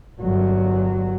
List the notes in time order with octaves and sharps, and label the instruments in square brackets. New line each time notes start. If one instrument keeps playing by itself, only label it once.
[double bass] G1 F#3